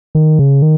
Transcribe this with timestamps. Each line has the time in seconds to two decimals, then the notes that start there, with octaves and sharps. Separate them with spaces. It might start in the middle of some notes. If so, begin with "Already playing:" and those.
0.15 D#3
0.39 C#3
0.62 D#3